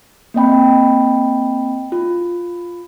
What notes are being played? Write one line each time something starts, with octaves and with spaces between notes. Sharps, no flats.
A#3 C4 D#5 G5 B5
F4